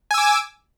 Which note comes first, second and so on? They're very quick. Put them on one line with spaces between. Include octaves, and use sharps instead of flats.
G#5 E6 D6